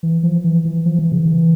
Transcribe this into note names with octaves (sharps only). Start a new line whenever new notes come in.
E3
F3
E3
E3
F3
E3
C#3
E3